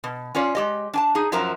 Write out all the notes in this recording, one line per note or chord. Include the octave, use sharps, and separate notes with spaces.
B2
C#4 F4 C#5 D5
G#3 G4 D#5
D4 G#5 A5
D#4 G#4
F#2 F3 F#3 A#4 E5 A#5